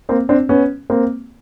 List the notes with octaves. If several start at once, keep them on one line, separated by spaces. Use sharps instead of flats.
A#3 C4
C4 D4
B3 C#4
A#3 C4